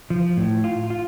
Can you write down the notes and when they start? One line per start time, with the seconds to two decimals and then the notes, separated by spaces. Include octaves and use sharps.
0.10 F3
0.37 A2
0.64 F4
0.90 F4